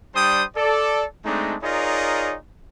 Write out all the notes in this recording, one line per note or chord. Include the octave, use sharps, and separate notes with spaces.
G3 D4 C5 G5 D#6
A4 D5
G#3 A3 C4 D4 D#4
D#4 F4 G#4 A#4 C#5 D5